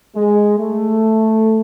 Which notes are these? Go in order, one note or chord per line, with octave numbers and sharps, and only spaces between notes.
G#3
A3